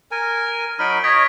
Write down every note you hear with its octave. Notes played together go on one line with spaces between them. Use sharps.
A#4 G#5
F#3 D#4 B5 F6 D7
C#5 D#5 G#6 B6 D7